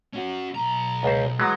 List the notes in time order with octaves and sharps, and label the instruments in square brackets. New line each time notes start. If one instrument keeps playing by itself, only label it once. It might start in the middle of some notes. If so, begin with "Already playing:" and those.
[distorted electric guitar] C#4 F#4
B1 A#5
[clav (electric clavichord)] C#2 C5
[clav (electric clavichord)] E3 F#3 G#3 [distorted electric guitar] B3 F#5